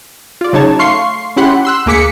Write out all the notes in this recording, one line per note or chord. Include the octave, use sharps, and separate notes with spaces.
F4 D5
C#3 F#3 D#4 C#5 A5
A3 F5 C6 C#6 C7
C#4 E4 G4 F#5 B5 C6
C6 E6 F#6
D2 A#3 G#4 D6 B6 C#7